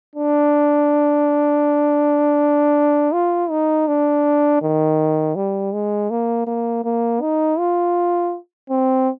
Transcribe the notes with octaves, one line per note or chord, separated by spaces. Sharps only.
D4
F4
D#4
D4
D#3
G3
G#3
A#3
A#3
A#3
D#4
F4
C4